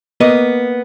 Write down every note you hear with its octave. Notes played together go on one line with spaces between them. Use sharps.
A#3 B3 D#5